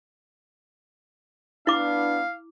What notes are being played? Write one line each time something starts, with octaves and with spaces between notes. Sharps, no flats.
B3 D4 E4 F5 D6